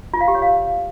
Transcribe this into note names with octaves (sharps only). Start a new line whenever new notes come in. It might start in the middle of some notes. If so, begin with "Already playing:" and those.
F4
F5
G4
C#5
F5